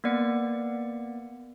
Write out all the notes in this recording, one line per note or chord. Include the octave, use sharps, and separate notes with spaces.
A#3 B3 D5 C#7